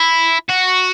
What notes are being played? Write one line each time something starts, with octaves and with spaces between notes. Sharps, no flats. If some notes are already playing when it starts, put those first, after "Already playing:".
Already playing: E4
F#4